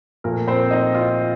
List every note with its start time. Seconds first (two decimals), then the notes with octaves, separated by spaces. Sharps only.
0.24 A#2 F3 A3 A#4
0.47 C4 C5
0.71 D#4 D#5
0.94 F4 F5